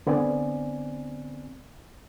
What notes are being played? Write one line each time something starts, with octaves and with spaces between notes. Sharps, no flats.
D3 B3 C4 D5 G#5